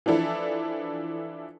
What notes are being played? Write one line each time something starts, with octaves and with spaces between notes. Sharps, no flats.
E3 F3 D4 E4 A4